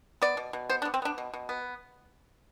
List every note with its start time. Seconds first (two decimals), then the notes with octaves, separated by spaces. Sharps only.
0.22 B3 D5
0.37 B2
0.53 B2
0.69 B3 C5
0.82 D4
0.85 B3
0.94 C4
1.02 B3 D4
1.18 B2
1.34 B2
1.49 B3